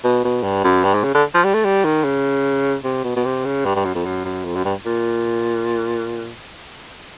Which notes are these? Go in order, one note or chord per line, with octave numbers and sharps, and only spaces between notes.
B2
B2
G2
F#2
G2
G#2
C#3
D3
F3
G3
A3
G3
D#3
C#3
C3
B2
B2
C3
C#3
G2
G2
F#2
F2
F#2
F#2
F2
F#2
G2
A#2